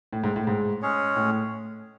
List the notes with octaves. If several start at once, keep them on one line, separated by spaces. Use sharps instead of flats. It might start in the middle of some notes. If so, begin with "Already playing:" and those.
A2
G#2
A2
G#2
G#3 C#4 G#4 C#5
A2